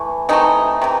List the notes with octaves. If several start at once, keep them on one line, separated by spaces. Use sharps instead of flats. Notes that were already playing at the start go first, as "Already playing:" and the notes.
Already playing: E3 A3
C3 E3 A3 D#4
C3 E3